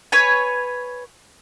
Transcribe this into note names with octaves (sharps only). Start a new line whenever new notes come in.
B4 C#5 G#5